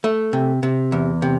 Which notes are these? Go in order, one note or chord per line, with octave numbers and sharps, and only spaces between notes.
A3
C3
C3
E2
C3